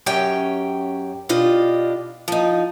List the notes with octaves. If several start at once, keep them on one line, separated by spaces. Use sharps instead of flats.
F#2 C#4 G4 G5
B2 D4 F4 G4 D#5
F3 D#4